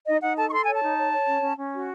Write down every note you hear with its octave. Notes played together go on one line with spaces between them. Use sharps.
D#4 D#5
D#4 F#5
A4 A5
C#6
A4 C6
C#5 G#5
A5
D#4
C#5
C#5
C#4
C#4
C#4
F#4